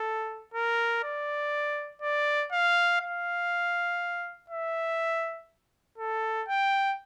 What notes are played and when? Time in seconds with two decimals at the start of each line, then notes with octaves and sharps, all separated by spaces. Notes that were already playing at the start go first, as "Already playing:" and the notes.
Already playing: A4
0.54 A#4
1.04 D5
2.02 D5
2.52 F5
3.01 F5
4.50 E5
5.98 A4
6.48 G5